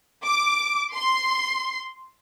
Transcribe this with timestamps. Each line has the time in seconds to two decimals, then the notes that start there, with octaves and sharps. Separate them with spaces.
0.24 D6
0.95 C6